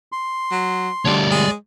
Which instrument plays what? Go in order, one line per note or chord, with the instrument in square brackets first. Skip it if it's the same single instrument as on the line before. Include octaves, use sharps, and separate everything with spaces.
[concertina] C6
[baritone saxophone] F#3
[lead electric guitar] D2 G3 [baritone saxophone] D4 [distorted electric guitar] C#5 D5
[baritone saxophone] G#3